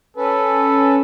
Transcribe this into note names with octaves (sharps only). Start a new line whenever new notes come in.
C#4 A4 B4